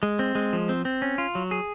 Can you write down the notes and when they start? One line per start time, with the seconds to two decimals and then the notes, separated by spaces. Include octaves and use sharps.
0.03 G#3
0.19 C4
0.35 G#3
0.53 F3
0.69 C4
0.85 C4
1.02 C#4
1.18 F4
1.35 F#3
1.51 G#4